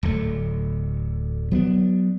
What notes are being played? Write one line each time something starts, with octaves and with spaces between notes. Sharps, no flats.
D1 D2 A3
F#3 B3 D4